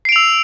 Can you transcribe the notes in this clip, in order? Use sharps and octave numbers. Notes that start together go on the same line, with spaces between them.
E6 C7 D7 F7